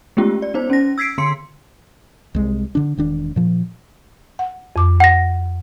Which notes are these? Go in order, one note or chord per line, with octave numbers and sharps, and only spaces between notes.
G#3 A3 B3 C#4 F4 G4
D5
B3 D#4 C5
C#4 A#6
E6 G#6 B6 C7 D7
D3 B3 C6 C#7
C2 G#3
D3 D4
E1 D#3 D4
A#2 F3
F#5
F2 D6
F#5 A#6